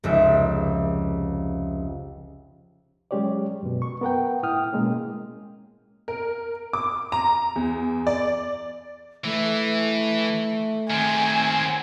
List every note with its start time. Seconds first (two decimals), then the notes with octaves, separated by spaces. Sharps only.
0.04 F1 C#2 E5
3.11 F#3 G#3 C#4 G4 C#5 D5
3.63 F#2 B2
3.82 C#6
4.01 B3 A#4 F#5 G5
4.43 A2 E4 G5 D#6 F6
4.73 B2 G#3 A#3 C#4
6.08 A#4
6.73 D6
7.12 A#5
7.56 E2
8.07 D5
9.24 E3 A3
10.90 D#3 C4 G#5